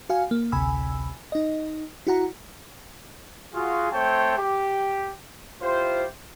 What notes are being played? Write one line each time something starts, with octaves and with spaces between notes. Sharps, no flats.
F#4 F5 G#5
A#3
A1 D2 C3 G#5 B5 E6
D#4 D#5
E4 F#4 F#5 A#5
F4 F#4 G#4
A3 C4 C5 C#5 G5 A5
G4
E4 F4 G4 C5